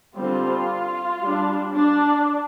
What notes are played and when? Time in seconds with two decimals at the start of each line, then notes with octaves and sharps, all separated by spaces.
0.16 D3 G3 C4 F4
1.21 G3 D4
1.74 D4